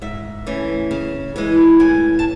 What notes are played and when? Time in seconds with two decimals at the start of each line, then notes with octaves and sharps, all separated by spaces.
0.02 G#2 E5
0.47 E3 A3 C#4
0.91 C#3
1.36 E3 G#3
1.80 A2 G#5
2.19 A5